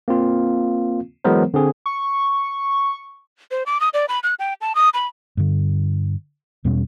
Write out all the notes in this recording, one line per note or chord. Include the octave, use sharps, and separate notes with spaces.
A#3 C4 F4
E3 F#3 G#3 B3 A#4 C5
D3 C4 G#4
C#6
C5
D6
D#6
D5
B5
F#6
G5
A5
D#6
B5
G2 D3
E2 B2 G3 C#4